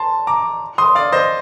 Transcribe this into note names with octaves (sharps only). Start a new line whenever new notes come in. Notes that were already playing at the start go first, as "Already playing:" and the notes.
Already playing: A5 C6
A#5 D6
C6 D#6
D5 F5
C5 D#5